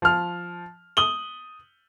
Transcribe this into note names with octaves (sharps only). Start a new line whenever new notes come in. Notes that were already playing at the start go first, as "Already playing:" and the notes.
F3 F6
D#6 F#7 G7